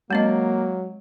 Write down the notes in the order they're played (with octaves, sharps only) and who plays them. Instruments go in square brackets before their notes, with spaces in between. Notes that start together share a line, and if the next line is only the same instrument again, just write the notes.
[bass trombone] F#3 [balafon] G#3 C4 D#5 [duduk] A#3